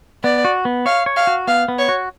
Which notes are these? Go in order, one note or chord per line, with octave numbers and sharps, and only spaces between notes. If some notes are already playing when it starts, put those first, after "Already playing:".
B3 D5
F#4
B3
C#5 F5
C#5
F5
F#4
B3 F5
B3
C#5
F#4